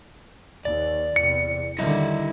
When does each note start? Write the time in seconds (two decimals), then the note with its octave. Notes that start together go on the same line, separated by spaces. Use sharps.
0.65 D#2 D5
1.16 E2 C3 C#7
1.79 D3 D#3 G3 E4 D#5 E5